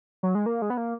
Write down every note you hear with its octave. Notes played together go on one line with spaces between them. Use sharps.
F#3
G#3
A#3
G#3
B3
A#3